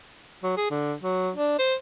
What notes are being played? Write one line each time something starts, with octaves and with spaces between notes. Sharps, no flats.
F#3
G#4
D3
F#3
D4
C5